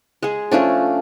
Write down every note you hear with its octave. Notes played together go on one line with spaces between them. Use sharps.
G#3 G#4
F3 A3 C#4 D4